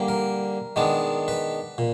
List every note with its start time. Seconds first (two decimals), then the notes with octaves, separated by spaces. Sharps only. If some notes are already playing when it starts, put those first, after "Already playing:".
Already playing: D3 G3 A#3
0.08 A#4
0.76 D#3 G#3 B3 D4
1.28 B4
1.78 A#2